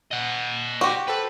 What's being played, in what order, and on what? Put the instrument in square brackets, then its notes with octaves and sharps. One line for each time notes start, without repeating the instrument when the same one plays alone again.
[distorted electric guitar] D#5 F#5
[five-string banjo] F#4 G4 [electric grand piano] C6 C#6
[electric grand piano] A4 C5 G5 [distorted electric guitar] B4